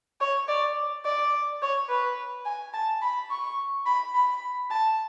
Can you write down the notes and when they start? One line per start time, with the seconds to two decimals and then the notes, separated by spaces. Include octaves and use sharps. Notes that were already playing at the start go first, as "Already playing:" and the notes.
0.21 C#5
0.48 D5
1.05 D5
1.62 C#5
1.89 B4
2.45 G#5
2.74 A5
3.02 B5
3.30 C#6
3.86 B5
4.15 B5
4.70 A5